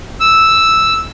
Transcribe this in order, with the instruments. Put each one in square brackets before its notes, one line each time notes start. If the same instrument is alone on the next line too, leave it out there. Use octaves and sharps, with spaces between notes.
[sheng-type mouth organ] E6